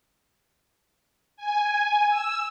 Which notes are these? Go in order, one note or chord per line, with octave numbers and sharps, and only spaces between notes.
G#5
E6